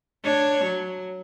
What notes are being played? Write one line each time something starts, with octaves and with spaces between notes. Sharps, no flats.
D4 C#5
F#3